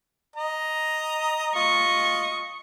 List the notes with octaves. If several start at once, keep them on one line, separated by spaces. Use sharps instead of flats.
D#5 A#5
F4 D#5 C#6